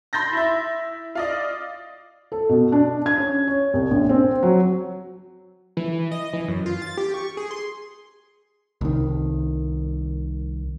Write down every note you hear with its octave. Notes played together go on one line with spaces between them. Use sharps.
B5 C6 G6 A6 A#6
E4 E5
F4 D5 D#5
A4
B2
D4
G#6
C#4
C#5
C2
A#1
C4
F#3
E3
D#5
E3
F#2
F4
A6
G4
C#6
G#4
C6
C2 D#3